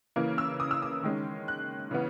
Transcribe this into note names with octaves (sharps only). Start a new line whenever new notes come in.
C#3 E3 A#3
E6
D#6
E6
D#6
D#3 G#3 C#4
F#6
C#3 E3 B3